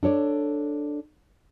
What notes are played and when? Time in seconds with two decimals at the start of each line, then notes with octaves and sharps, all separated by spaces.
0.03 D4 A4 C#5 D5